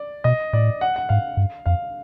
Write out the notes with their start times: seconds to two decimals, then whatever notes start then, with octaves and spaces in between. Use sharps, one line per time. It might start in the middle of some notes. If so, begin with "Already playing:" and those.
Already playing: D5
0.24 B2 D#5
0.53 A2 D5
0.81 F#5
0.96 F#5
1.09 G#2 F5
1.37 G2
1.66 F2 F5